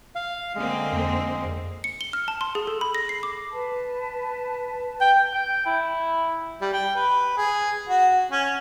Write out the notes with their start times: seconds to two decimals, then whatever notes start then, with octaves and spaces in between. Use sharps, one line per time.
0.15 F5
0.55 D3 G#3 A#3 C4
0.93 F2
1.84 C#7
2.01 G7
2.13 F6
2.28 A5
2.41 C6
2.55 G#4
2.67 A4
2.81 B5
2.95 A#6
3.09 C7
3.23 D6
3.52 B4 A5
5.01 G5
5.34 G5
5.66 E4
6.61 G3
6.73 G5
6.95 B4
7.37 G#4
7.89 F#4
8.31 C#4